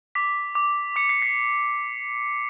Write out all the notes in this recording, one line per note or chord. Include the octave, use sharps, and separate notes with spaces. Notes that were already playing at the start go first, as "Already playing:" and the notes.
D6 B6
D6
D6 C#7
C7
B6